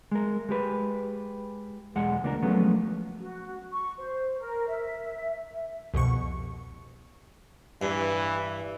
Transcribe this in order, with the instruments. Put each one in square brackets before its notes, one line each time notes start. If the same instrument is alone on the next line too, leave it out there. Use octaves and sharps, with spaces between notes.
[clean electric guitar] G#3 A#4
G#3 G4 B4
B1 E2 G#3 F#5
C#2 A#3 D4 F#4 A#4
F3 F#3 G#3 A3 B3 C#4
[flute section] F#4
C#6
C5
A#4
E5
[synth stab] C2 F2 B2 C#6
[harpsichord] G2 [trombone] E3